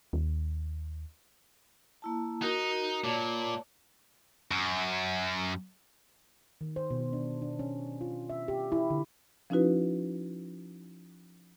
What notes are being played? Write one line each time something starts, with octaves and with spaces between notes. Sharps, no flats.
D#2
A#3 E4 A5
D#4 F#4 A#4
A#2 C#5 D5 A5
F#2
D#3
C5
B2
D4
D4
C#4
F4
E5
G4
E4
D3
F3 C#4 D#4 E4 F#4 B4